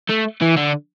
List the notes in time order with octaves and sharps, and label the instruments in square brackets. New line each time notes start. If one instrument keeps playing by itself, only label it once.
[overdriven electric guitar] A3
E3
D3